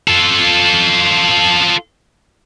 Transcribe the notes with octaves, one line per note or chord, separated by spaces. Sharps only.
F4 A4